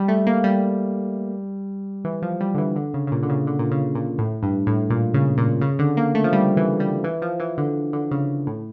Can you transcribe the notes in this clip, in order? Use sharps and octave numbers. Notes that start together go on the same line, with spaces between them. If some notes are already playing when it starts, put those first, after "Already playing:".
Already playing: G3
A3
A#3
G3
E3
F3
G3
D3
E3
D3
C#3
C#3
A#2
D3
C#3
D3
A#2
C#3
A#2
A2
G2
A2
A#2
C#3
A#2
C#3
D3
A#3
A3
F3
G3
E3
G3
E3
F3
E3
D3
D3
C#3
A2